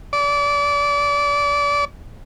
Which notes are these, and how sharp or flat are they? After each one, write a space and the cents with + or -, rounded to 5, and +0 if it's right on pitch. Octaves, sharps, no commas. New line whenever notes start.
D5 -30